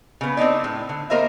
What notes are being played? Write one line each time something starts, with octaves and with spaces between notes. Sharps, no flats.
C#3 B3
C4 D4 D#4 D5
A2
D3
A#3 A#4 C5 D#5 E5